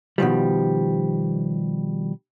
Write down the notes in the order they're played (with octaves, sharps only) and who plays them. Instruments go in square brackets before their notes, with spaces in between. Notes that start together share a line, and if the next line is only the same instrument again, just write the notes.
[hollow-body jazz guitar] B2 D#3 F3 G3